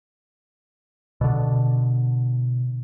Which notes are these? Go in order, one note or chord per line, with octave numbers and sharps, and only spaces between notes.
B2 D3